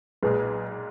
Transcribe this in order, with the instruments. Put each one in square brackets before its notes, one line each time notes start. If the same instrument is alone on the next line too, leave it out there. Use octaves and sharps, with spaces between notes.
[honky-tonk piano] B1 A#2 G#3 [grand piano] G#4 B4